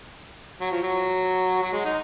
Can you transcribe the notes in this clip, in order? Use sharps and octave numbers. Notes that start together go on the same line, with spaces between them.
F#3
F3
F#3
F#3
G#3
D#4